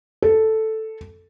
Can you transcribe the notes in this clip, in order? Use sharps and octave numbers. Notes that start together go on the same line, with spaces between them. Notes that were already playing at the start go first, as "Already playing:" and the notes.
A4